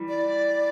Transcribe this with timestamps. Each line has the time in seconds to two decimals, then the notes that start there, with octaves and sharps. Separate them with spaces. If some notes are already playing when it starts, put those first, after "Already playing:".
Already playing: E3 G3
0.08 D5